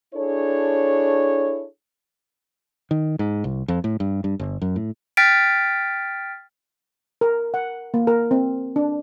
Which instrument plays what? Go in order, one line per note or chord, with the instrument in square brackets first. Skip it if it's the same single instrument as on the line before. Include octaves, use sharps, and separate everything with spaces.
[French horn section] D4 E4 G#4 A4 C#5
[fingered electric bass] D#3
G#2
C2
F2
A2
G2
G2
G1
F#2
A2
[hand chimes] G5 F6 A6 B6 D7
[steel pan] A#4
F#5
A#3
A#4
C4
D4